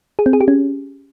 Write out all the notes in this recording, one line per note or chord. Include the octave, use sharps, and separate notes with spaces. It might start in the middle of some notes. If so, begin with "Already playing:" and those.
G#4
C4
G#4
G4
C#4